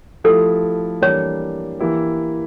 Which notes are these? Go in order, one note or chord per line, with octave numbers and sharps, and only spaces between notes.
F3 A3 E4 G4 A4
E3 G3 A#3 D4 C#5
E3 A#3 E4 G4